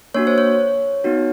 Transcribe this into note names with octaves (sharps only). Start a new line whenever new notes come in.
A#3 D4 F#4 C#5
C5
C#5
B3 D#4 F#4